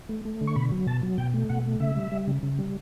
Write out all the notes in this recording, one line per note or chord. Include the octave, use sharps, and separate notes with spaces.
A3
A3
D3
C#6
B2 B5
F#3
B2 A5
F#3
B2 G5
A3
B2 F#5
A3
C#3 E5
G3
G3
C#3
C#3
G3